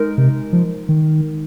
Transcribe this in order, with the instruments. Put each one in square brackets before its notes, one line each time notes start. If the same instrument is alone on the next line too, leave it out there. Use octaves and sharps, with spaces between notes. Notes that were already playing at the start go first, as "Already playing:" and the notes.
Already playing: [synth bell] G#3 D#4 A#4
[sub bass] C3
F3
D#3